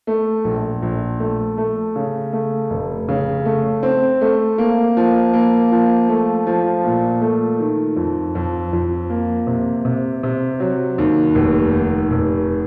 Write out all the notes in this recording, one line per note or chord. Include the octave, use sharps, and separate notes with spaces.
A3
A#1
A#1
A3
A3
C#3
A3
F1
C#3
A3
C4
A3
A#3
F3
A#3
F3
A3
F3
A#2
A3
D#3
F2
F2
F2
A#3
C3
C3
C3
F#3
D#2
F1
D#3
F1